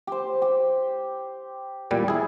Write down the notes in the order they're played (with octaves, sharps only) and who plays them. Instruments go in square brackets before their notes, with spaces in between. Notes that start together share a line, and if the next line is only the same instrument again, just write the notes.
[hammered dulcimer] G4 C5
G4
[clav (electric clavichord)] E2 A#2 G3
E4 G#4